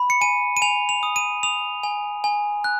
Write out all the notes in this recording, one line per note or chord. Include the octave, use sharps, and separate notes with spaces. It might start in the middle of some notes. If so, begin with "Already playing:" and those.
Already playing: B5
C#7
G#5 D#7
D#7
G#5 F7
F7
D#6
D#7
D#6 F7
G#5
G#5
F#6